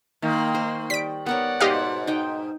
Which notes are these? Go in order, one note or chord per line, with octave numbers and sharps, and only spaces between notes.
D#3 A#3 C6
C5
G3 B6 D7
B3 A#4 C#5 D5 F#5
G#2 B2 G4 D#5 F5
D#4 G5